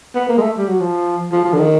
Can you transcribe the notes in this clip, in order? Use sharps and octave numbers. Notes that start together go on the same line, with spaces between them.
B3
A#3
G#3
A3
G3
F#3
F3
F3
F3
D3
D#3